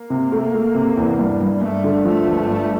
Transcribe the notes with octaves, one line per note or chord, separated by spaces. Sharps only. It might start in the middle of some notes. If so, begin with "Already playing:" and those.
Already playing: A#3
C3
A3
A3
C3
E2
G2
G2
G2 A3
D3
F3 A3
G1
G2